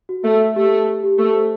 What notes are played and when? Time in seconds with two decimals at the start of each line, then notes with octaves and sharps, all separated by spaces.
0.09 F#4
0.24 A3 E5
0.40 E5
0.56 A3 G4
0.72 G4
0.87 G4
1.03 G4
1.18 A3 C#6
1.34 C5